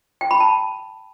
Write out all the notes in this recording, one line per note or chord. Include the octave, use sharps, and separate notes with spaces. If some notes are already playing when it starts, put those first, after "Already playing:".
G5
B5
A5